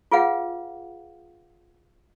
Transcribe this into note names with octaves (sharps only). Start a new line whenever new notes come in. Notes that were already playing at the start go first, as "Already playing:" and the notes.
F4 G#4 B4 F5 F#5